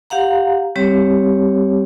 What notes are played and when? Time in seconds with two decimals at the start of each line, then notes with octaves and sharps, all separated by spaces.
0.10 G4 F5 F#5 A#5
0.76 G3 C4 G4 C#5